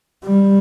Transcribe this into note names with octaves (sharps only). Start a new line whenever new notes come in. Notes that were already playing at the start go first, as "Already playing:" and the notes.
G3